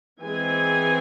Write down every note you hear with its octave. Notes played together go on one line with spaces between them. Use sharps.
E3 G#3 C4 G#4 G#5